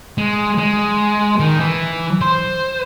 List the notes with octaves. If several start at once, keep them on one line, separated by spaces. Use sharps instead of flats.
G#3
G#3
D#3
E3
C5